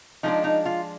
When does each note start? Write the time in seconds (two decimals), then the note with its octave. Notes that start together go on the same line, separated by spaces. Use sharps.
0.23 F3 G#3 D4 D#4
0.44 D#4
0.65 F4